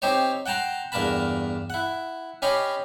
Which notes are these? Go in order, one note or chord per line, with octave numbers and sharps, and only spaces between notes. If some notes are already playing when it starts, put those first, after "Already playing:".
C4 D#4 G4 C5 C#5
F#5 G5 A5 A#5 C6
E2 G2 A#3 A#4 A5 B5
E4 F#5
C#4 G4 C#5 D#5 B5 C6